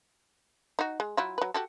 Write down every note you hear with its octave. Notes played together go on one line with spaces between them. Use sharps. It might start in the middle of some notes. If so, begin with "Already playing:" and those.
D#4 F#4
G#3
F#3 E4 F4
F#3 B4
F#4 G4 A4